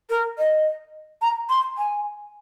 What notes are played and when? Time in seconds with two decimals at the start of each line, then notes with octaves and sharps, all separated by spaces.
0.10 A#4
0.38 D#5
1.22 A#5
1.49 C6
1.78 G#5